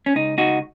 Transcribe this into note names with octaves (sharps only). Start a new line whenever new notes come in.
C#4
C#2 D#4
D#4 F#4